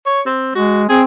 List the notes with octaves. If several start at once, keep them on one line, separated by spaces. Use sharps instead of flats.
C#5
C4
G#3 F#4
C4 G#4